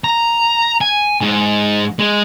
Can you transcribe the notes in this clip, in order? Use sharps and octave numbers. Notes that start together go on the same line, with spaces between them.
A#5
G#5
G#2
G#3